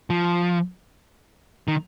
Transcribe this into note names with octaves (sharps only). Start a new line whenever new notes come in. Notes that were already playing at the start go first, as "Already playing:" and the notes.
F3
D#3